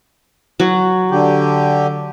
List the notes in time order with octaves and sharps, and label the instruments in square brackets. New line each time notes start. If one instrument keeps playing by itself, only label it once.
[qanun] F#3
[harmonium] D3 G4